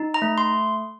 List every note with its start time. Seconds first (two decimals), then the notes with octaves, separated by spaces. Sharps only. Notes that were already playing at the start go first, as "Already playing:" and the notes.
Already playing: D#4
0.14 A#5
0.22 A3
0.38 C6